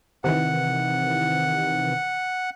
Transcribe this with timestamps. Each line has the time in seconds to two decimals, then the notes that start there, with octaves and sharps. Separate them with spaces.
0.24 C3 D#3 E3 F#5